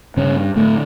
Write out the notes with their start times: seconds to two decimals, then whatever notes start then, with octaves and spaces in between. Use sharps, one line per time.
0.17 G2 C#3 C#4
0.56 A2 D3 A3